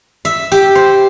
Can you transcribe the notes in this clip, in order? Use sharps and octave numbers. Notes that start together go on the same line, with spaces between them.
E5
G4
C5